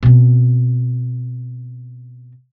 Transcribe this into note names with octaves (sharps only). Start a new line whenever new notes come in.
B2 C4